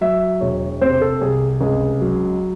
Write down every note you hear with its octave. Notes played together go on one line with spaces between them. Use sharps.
F#3 E5
E1 C#5
C3 C5
A4
C2 G#4
C#2 G#4
F#3